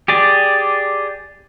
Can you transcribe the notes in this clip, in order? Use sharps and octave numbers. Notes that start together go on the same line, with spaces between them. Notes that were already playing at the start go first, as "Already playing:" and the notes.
G4 G#4 D5